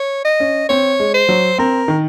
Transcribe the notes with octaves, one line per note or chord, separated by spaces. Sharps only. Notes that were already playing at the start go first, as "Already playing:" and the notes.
Already playing: C#5
D#5
C#4
C4 C#5
G#3
C5
F#3
C4 A#4
D#3